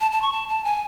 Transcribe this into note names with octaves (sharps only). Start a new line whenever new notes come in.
A5
A5
C#6
A5
A5
G#5